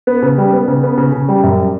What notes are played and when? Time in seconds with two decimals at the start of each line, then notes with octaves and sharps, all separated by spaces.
0.07 B3
0.22 C#3
0.38 G3
0.53 B3
0.68 C#3
0.83 B3
0.98 C#3
1.12 C#3
1.28 G3
1.43 F#2